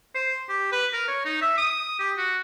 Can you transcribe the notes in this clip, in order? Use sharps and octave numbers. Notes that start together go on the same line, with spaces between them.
C5
G4
B4
A#4
C#5
D#4
E5
D#6
G4
F#4